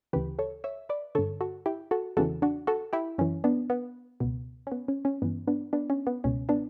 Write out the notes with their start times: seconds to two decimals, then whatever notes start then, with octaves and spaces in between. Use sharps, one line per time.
0.13 D2 C#3 E3 G4 B4
0.39 A4 C#5
0.64 C#5 E5
0.89 B4 D5
1.15 G2 D3 A4 C#5
1.41 F#4 A4
1.66 E4 G4
1.91 F#4 A4
2.17 E2 C#3 E3 F#4 A4
2.42 D4 F#4
2.67 F#4 A4
2.93 E4 G4
3.18 F#2 E3 C#4
3.44 B3 D4
3.70 B3
4.20 C#2 B2
4.67 C#4
4.72 B3
4.88 C#4
5.05 C#4
5.22 G2 E3 B3
5.47 B3 D4
5.73 B3 D4
5.90 C#4
6.07 B3
6.24 C#2 B2 C#4
6.49 B3 D4